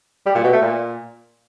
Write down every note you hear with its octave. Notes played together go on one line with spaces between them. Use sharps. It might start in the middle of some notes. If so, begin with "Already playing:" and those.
G3
A#2
B2
A3
A#2